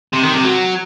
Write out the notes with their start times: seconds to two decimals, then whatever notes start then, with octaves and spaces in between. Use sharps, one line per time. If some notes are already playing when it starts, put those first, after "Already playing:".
0.13 C3
0.23 D#3
0.33 C3
0.43 F#3